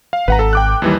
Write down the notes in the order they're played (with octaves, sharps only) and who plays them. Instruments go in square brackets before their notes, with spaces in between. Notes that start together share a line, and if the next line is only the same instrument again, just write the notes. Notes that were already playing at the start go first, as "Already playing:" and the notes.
[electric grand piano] F5
[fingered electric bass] G#1 [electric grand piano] B4 F#5 A#5
[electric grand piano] A4 A5
G5 D6 F#6
D#2 E3 G3